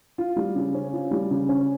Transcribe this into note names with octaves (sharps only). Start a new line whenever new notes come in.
F4
G3
C#3
C#4
F4
G3
C#3
C#4